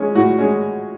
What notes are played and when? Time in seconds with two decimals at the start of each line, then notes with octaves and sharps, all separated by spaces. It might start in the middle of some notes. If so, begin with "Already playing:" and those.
Already playing: G#3 C#4
0.15 A2 F#4
0.39 G#3 C#4